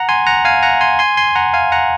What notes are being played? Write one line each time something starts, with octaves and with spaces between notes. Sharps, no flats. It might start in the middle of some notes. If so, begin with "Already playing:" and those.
Already playing: F#5 A#5
G#5 C6
F#5 A#5
F5 G#5
F#5 A#5
G#5 C6
G#5 C6
G#5 C6
F#5 A#5
F5 G#5
F#5 A#5